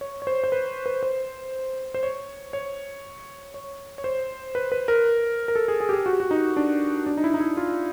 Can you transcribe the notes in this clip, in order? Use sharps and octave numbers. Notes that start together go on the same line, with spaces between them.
C#5
C#5
C5
C5
B4
B4
C5
C5
C#5
C#5
C#5
C#5
C5
B4
B4
A#4
A#4
A4
G#4
G#4
G4
G#4
F#4
G4
F#4
D#4
D4
D4
D#4
E4
D#4
E4
F4